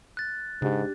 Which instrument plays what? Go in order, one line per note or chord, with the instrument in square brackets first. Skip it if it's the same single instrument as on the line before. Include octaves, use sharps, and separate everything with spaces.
[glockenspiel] F#6 A6
[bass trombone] G#2 [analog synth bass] C#3 [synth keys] D4 G4